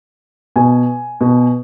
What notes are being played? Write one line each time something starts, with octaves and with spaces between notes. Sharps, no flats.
B2 G#5
B2